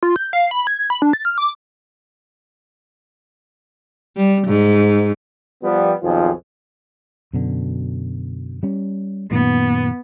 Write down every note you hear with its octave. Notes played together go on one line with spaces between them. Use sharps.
F4
G6
F5
B5
G#6
B5
D4
A6
F6
D6
G3
G#2
F3 G3 B3
B1 F2 D#3 F3 F4 G#4
F#2 B2 D3
G3 C#4
F#2 A#2 D#3 B3